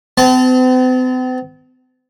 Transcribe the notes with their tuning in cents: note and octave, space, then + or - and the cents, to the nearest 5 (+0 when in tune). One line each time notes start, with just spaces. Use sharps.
C4 -45 A5 -25